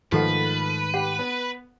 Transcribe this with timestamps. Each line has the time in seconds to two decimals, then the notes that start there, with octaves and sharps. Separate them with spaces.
0.12 G#2 D#3 F3 A3 G4 A4 B4 F#5
0.94 G4 F#5
1.19 B3